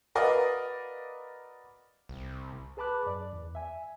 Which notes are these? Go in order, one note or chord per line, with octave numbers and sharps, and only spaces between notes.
F#4 A#4 B4 D5 D#5 F5
C2
G#4 B4 A5 B5 D6 F#6
F#2 D5
E2
E5 G#5